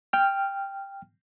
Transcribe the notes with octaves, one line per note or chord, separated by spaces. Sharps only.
G5 F6